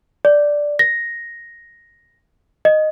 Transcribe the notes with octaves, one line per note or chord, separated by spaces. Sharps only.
D5
A#6
D#5